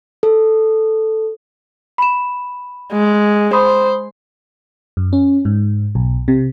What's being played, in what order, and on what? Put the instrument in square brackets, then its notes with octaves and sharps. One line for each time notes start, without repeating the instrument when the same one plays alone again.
[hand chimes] A4
[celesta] B5 E7
[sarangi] G#3
[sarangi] C5 [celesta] B5 C6 D#6
[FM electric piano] F#2
C#4
G#2
B1
C3